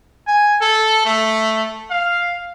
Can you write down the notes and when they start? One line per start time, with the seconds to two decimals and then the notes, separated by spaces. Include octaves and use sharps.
0.27 G#5
0.61 A4
1.05 A3
1.90 F5